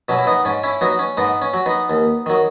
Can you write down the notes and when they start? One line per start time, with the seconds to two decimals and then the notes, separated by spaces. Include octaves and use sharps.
0.09 B2 F#3 C#4
0.19 E4
0.27 B3 D#4
0.45 G#2 C#4
0.63 C#4 E4
0.81 F#3 B3 D#4
0.99 C#4
1.17 G#2 B3 D#4
1.42 C#4
1.53 F#3
1.66 B3 D#4
1.90 D#2
2.26 D#3 F#3